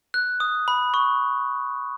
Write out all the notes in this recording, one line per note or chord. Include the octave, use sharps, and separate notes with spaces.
F#6
D#6
B5
C#6